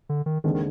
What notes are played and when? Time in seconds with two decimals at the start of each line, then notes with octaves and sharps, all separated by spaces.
0.09 D3
0.26 D#3
0.44 D#2 D3 D#3 G#3 C4
0.54 D#3